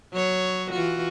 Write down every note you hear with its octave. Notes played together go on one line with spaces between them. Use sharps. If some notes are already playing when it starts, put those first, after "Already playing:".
F#3 C#5
E3 F4 F#4